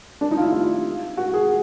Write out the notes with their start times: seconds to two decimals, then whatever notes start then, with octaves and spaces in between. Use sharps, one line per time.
0.21 D4
0.31 D#4
0.37 F4
0.42 E4
0.53 F4
1.17 F#4
1.34 G#4